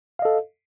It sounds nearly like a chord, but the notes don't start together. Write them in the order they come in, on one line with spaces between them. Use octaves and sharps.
F5 D#5 A4